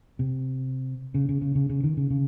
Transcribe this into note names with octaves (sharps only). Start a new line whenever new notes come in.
C3
C#3
C#3
C#3
C#3
C#3
D#3
C#3
C#3